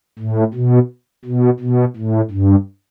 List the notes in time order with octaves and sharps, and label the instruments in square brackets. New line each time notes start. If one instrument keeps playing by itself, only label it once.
[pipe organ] A2
B2
B2
B2
A2
G2